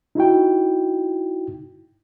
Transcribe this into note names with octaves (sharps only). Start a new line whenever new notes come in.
D#4 E4 F#4 G5